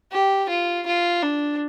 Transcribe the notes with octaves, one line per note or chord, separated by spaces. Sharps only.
G4
F4
F4
D4